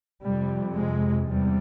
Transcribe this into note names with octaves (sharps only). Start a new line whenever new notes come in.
F2 C3 G3
G#3
E2 C3 G3